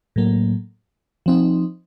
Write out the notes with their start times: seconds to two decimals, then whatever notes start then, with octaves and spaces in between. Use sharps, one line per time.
0.16 A2 F#3 A#3
1.26 F3 C4 D#4